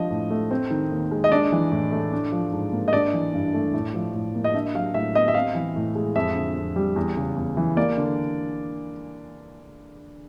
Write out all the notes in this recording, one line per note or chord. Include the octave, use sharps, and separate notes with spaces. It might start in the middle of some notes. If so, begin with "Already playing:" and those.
Already playing: F3 D4 D#5
A2
A3
C4
D#3
D#2
G#3
D#5
D4 D5
E3
A2
A3
D4
F3
G#2
A#3
D#5
D4 D5
E3
G2
A3
A2
F3
A2
A#3
D#5
D4 E5
F#3 F5
A2 E5
B3 D#5
E5
C4 F5
E3
A2
G#3
F2 E5
D3
F2
G3
E2
C#3
E2
E3
A#3 D5
D3